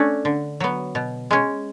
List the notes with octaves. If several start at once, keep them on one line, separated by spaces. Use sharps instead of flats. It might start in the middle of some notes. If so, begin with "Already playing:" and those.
Already playing: A3 C#4 D4
D3
F#3 B3
B2
G#3 C#4